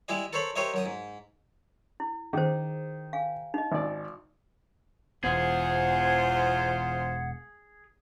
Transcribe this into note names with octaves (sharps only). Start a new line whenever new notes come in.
G3 G#3 E4 G#4 D#5
A4 A#4 C5 C#5 B5
G4 A#4 C5 C#5 D#5 E5
F#2 A#4 D#6
G#2
E4
D#3 G#4 C5
F5 G#5
D#4 D#5
G#1 D5
E1 E2 B3 F4 G#4 C5 F#5